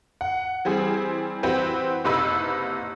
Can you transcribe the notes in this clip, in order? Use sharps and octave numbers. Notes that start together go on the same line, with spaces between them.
F#5
E3 G3 C4 G#4
E3 C4 F#4 G4 B4
F#1 C3 D#4 B4 B5 E6